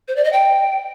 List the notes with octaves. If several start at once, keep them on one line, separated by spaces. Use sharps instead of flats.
C5
D5
D#5
G5